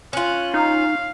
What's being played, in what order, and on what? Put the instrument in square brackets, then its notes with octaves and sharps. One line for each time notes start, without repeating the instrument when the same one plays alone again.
[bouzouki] C#4 F4 [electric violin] F#6
[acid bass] D#4 [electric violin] F5